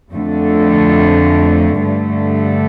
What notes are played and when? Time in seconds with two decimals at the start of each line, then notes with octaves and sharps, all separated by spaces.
0.13 F2 D3 A3
1.83 G2 D3 A3